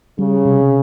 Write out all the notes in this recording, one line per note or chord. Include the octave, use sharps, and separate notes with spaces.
C#3 G3
C3